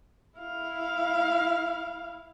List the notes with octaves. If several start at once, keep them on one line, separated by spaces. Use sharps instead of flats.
E4 F5